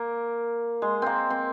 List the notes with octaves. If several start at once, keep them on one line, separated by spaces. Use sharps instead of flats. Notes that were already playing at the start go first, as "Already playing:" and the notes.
Already playing: A#3
G#3
A#3 C4
C4